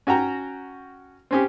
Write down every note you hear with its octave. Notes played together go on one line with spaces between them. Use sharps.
C#4 F#4 G5 A#5
C4 C#4 G4